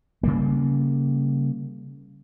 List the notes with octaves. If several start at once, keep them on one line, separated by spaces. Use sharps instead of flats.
C#3 G3 A#3